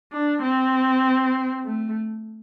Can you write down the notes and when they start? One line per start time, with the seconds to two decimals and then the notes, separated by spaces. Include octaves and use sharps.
0.12 D4
0.43 C4
1.65 A3